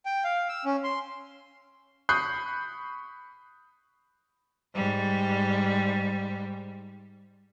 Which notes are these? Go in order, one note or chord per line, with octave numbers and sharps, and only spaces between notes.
G5
F5
E6
C#4
C6
B5 C#6 D#6 F#6 G6 C7
G#2 G3